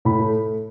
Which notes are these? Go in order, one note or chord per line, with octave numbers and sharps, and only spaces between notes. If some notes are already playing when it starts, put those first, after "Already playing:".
A2 B5
A3